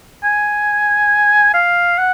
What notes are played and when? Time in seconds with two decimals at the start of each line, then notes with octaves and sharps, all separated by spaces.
0.24 G#5
1.54 F5
1.98 F#5